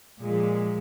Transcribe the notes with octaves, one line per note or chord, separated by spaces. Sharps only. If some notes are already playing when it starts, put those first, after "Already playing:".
A#2 F3 G#3